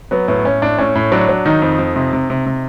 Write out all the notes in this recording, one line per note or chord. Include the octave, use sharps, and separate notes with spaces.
F#3 B3
A2 B3
A2 C#4
A2 D4
A2 C#4
A2
F#3 D4
F#3
D#3 D#4
F2
F2
C3
C3
C3
C3